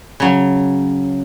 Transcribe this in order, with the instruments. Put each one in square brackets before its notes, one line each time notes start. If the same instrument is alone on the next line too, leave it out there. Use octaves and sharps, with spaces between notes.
[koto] C#3 F#3